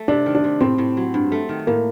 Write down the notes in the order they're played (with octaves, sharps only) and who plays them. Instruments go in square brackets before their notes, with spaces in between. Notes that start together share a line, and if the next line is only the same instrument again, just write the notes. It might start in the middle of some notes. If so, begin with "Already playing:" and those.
Already playing: [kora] A3
[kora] C3 [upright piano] D4
[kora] D#3
[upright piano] D4
[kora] C3
[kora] A2 [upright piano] C4
[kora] A2
F#3
G2
A3
D#3
[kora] A2 [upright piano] A#3